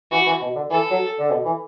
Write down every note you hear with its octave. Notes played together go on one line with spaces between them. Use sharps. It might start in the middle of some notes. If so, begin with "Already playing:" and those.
E3 F#4
E3
B2
D3
E3 A4
F#3
D3
B2
E3